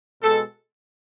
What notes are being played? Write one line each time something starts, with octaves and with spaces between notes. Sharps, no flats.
B2 G#3 A4